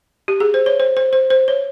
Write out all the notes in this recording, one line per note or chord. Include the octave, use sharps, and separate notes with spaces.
G4
G#4
C5
C#5
C5
C5
C5
C5
C#5